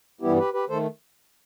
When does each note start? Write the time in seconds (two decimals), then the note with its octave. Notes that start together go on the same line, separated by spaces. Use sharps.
0.21 G2 E3 G3 B3 E4 G4
0.38 G4 B4
0.53 G4 B4
0.69 D#3 A3 A4 C5